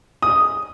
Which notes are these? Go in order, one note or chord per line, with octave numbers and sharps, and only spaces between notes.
D#6